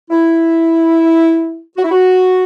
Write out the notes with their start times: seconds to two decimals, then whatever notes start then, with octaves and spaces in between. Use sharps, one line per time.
0.10 E4
1.77 F#4
1.84 E4
1.92 F#4